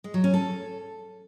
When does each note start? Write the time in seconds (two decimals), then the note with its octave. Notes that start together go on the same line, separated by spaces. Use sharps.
0.04 G#3
0.14 F#3
0.24 C#4
0.34 A4